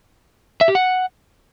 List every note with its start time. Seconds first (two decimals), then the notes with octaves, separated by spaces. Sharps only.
0.61 E5
0.68 G4
0.75 F#5